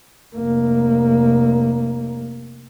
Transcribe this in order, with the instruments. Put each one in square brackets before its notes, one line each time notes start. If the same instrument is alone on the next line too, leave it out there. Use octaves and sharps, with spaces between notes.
[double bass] F1 A#3